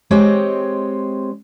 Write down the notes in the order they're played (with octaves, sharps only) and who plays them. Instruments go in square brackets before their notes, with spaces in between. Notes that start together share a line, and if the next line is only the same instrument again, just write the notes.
[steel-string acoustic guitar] G#3 C4 G4 C#5 D#5